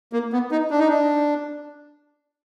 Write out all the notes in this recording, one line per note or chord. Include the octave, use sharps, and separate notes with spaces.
A#3
B3
D#4
D4
D#4
D4